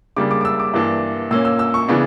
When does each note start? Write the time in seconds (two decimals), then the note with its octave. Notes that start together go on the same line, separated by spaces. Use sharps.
0.17 C#3 G3 A#3 D4 D6
0.31 D6
0.41 D6
0.45 E6
0.60 D6
0.74 G2 E3 A#3 D4
1.31 A#2 A#3 C#4 E6
1.45 E6
1.59 E6
1.74 C#6
1.88 C#3 E3 B3 D4